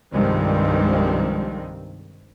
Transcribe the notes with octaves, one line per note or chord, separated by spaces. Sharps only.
C2 G2 D#3 F3 G#3 C4